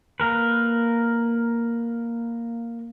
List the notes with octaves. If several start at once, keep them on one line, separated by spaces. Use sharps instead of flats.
A#3 A#4 B4